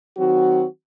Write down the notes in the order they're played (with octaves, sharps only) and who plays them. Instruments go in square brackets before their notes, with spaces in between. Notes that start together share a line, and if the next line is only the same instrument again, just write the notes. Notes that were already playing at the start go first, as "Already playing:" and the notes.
[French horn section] D#3 F#3 C4 F#4